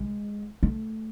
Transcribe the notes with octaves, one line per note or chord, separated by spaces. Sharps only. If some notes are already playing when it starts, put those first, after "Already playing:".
Already playing: G#3
A3